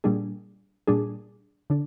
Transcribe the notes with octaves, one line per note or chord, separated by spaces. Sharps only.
A#2 G3 D4 G#4
A#2 G3 D4 G#4
D3 D4